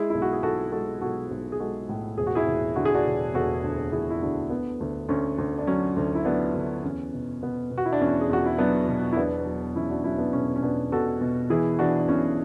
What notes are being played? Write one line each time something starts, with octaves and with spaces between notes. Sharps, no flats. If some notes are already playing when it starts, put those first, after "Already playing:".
Already playing: G#3 E4 G#4
B1 E4
F#4
G#4
B1 F#4 A4
G#3 F#4 A4
B1 F#4 A4
B1
G#4
G#3 F#4 A4
A2
E1 G#4
F#4
E4 G#4
E1
D3 F#4
G#4
D4 F#4
E1
E1 F#4 A4
D2
E1 E4 G#4
E4
D2 D4 F#4
D3 B3
D2
D2 C#4
D2
D4
F#3 C#4
D2
E4
F#3 B3 D4
D2
E2 C#4
B2
B2 B3
B2
F#4
E4
D4
E2 C#4
G#4
E2 F#4
E4
F#3 B3 D4
B2
E4
E1 B3 D4
F#3
E2 C#4 E4
D4 F#4
F#3 C#4 E4
B3 D4
E1 C#4
C#4
B2 B3 D4
B2 F#4 A4
B2
E3 E4 G#4
E3 D4 F#4
D4
B1 C#4 E4